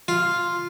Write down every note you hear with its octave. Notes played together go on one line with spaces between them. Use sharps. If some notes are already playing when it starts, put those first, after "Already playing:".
F4